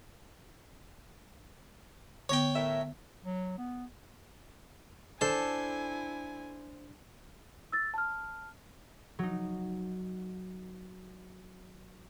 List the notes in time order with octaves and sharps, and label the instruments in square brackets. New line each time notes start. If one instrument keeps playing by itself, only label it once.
[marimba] D3 B3 [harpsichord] C#5 G5
[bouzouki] A2 A#4 E5
[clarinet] F#3
B3
[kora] D4 A4 [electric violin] E4 G#5 [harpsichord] C5
[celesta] E6 A6
A5 F6
[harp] F#3 D#4